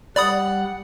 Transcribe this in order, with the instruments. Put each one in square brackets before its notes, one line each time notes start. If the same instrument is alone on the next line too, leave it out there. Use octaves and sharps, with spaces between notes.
[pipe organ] G3 F#5 [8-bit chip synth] D5 B5 D#6